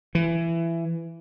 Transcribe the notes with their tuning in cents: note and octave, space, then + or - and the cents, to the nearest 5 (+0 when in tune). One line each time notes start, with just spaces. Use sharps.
E3 +20